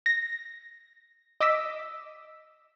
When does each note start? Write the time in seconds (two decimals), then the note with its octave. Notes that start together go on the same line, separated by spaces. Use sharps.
0.06 A#6
1.41 D#5 D6 E6 B6